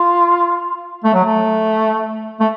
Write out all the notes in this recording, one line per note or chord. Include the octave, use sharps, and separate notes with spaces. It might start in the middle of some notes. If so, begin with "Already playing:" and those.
Already playing: F4
A3
F#3
A3
A3